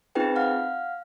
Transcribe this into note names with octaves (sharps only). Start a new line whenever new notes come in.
C4 D#4 F4 G#4 B4 G5
F5 F#5 F6